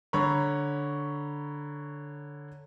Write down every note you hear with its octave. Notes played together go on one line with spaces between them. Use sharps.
D3 C#5 A#5 B5 C#6